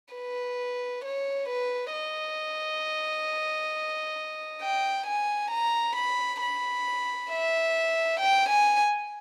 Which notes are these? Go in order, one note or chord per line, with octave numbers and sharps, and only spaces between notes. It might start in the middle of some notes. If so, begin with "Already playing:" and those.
B4
C#5
B4
D#5
G5
G#5
A#5
B5
B5
E5
G5
G#5